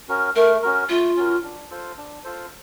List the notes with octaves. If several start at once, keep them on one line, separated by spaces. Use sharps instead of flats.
C#4 F#4 A#4
A3 A#4
C#4 F#4 A#4
A3 F4
C#4 F#4 A#4
D4
F4 A4 C5
D4
F4 A4 C5